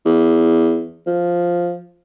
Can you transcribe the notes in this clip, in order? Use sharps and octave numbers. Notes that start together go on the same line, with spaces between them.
E2
F3